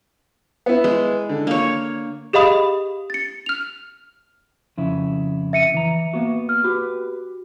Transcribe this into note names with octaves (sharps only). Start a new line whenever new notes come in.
B3 E4
G#3
D3
A#3 C#5
G4 G#4 D#5 F5 B5 D#6
A6 C#7
F6 F7
F2 C#3 E4
E5 C#7 D#7
E3 A#5
A#3 B3 F#4
F6
F#4 G4 B4